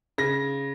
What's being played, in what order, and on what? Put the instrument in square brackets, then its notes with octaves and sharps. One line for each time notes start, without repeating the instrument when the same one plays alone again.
[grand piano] C#3 A#6